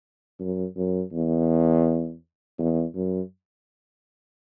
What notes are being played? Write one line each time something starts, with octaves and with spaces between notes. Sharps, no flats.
F#2
F#2
E2
E2
F#2